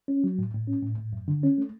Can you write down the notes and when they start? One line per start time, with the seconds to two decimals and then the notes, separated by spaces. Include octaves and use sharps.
0.08 C#4
0.24 F#3
0.39 A2
0.54 A2
0.67 C#4
0.83 A2
0.98 A2
1.13 F#2
1.28 D3
1.43 C#4
1.58 A3